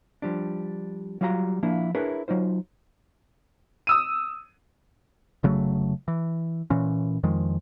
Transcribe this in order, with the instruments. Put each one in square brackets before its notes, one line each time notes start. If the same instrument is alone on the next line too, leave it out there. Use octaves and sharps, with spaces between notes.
[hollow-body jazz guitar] F3 G3 D4
F#3 G3 F4 F5 G#5 A#5
F3 A#3 D4 E4
D4 E4 G#4 A#4 B4 C#5
F#3 D#4 F4 C5
[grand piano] D#6 E6 D#7
[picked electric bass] F1 C#3 F#3 A3
E3
A#2 E3 C#4
F2 D#3 F3 G#3